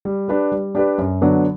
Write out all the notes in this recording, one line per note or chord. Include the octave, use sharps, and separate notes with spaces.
G3
D4 G4 B4 D5
G3
D4 G4 B4 D5
F#2
D3 F#3 B3 D4